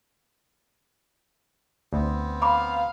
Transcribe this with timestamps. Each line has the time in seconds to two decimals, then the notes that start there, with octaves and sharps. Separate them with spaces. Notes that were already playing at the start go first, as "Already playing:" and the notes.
1.93 D2 B3 C4
2.42 F5 A#5 B5 D6